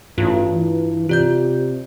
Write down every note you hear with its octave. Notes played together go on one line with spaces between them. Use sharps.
A1 G2 F4
E3
C3 F4 D5 G6